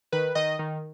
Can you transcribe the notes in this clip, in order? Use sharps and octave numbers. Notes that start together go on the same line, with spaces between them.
D#3 B4
D#3 D#5
D#3